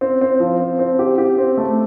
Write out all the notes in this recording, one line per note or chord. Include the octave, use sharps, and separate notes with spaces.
C4
C4
F3
C4
C4
G4
G4
C4
A3